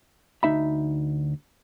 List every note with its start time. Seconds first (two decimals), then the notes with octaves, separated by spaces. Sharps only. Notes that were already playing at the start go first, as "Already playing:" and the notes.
0.43 D2 D#4 E5 B5